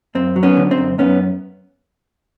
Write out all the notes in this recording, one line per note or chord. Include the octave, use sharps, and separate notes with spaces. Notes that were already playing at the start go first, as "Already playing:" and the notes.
F#2 C4
F#3
B3 C#4
D3
C4
F#2
F#2 B3 C#4